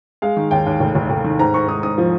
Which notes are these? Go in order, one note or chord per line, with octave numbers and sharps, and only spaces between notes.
G#3 F5
D#3
D#2 G5
D#2
F1
F1
F1
D#3
G#2 A#5
G#2 C#6
G#2 D#6
G#2 D#6
F3